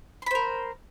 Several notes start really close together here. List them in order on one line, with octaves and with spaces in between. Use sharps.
C6 B5 C5 A#4